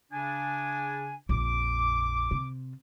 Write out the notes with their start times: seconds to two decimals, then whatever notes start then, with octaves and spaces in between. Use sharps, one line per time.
0.12 C#3 D4 G#5
1.29 A#1 F2 D6
2.31 C3